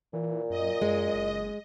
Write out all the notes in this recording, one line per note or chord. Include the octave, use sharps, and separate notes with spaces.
A#2 E3
F#2 D#5
F#2 G#3
F#1